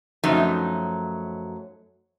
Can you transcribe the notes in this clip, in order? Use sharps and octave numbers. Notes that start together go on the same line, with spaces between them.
F#2 F3 F#3 A3 D#4